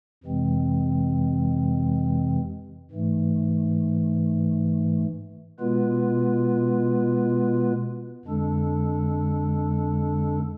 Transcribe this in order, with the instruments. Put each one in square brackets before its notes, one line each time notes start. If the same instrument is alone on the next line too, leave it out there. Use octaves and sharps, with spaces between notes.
[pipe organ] F2 C3 E3 G#3 C4
G#2 E3 A3
B2 G#3 B3 F4 B4
F2 D3 G#3 D4 A4